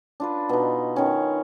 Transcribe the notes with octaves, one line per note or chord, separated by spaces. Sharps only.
D4 F4 B4
B2 D#4
D#3 C#4